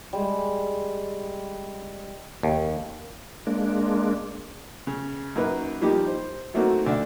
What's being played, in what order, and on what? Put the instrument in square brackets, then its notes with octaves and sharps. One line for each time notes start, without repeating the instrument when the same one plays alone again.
[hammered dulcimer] G3 G#3
[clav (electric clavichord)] D#2
[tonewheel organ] G#3 A#3 D4
[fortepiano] C#3
F#2 A#3 D#4 B4
F3 G3 A#3 D#4 G4
C5
F#3 A3 A#3 C4 D#4 F#4
D2 D3 D4 D5 E5